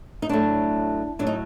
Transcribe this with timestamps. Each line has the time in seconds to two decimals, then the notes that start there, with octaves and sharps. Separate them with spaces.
0.22 D#4
0.29 A2 F#3 A3 D4
1.19 A2 F#3 A3 D4
1.27 D#4